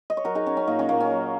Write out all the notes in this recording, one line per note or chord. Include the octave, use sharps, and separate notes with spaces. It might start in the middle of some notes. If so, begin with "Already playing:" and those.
D#5
C#5
F#3 F#4 A#4
D#4 G#4
F#3 C#4
C#4
A#2 A#3 D#4
C#4
A#2 A#3
C#4
F#3